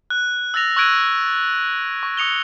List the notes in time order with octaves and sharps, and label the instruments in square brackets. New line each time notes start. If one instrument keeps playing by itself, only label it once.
[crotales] F#6
E6 F#6 A6 A#6 F7
C#6 E6 F#6 G#6 D7 D#7
C#6
D#6 C#7 F7 G7